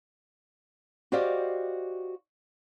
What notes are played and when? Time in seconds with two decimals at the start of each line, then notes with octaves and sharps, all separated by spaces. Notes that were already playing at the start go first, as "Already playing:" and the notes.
1.12 F#4 G4 C5 D5 D#5 F5